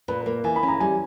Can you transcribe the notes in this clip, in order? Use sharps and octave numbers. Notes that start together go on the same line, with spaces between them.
A#2 B4
B4
A#3
E3 G#5
B5
C#4
A#5
G3 G#5